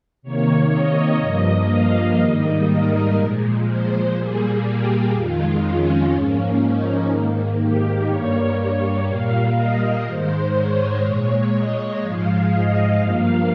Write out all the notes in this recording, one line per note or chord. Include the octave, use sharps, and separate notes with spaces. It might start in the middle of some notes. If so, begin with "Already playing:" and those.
C3 D#3 A#3 C#5
D#5
G2 F3 A#3 D#5
F5
G#2 D#3 G3 A#3 D#5
A#4
A#2 F3 G#3
C5
A#2 G3 A#3 G#4
G4
F2 D#3 G#3 F4
C#4
G#2 F3 A#3 C#4
D#4
G#2 D#3 A#3
G4
G2 G3 A#3 C#5
A#2 G3 A#3 F5
D#5
G#2 D#3 G#3 C5
C#5
A#2 G#3 C#5
D#5
G#2 F3 G#3 F5
D#5
G2 F3 A#3 F5